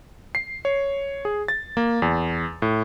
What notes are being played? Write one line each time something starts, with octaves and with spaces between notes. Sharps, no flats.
C7
C#5
G#4
A6
A#3
E2
A2